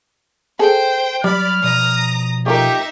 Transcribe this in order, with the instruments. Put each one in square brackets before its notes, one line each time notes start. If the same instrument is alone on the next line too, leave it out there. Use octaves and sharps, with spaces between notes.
[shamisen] G#4 A4 [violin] C5 G5
[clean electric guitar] F#3 [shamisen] G3 [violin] D5 B5 [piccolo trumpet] F6
[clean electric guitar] B2 F3 D5 [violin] A#5 D#6
[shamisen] A3 F4 A#4 [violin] D#4 E5 [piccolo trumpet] G4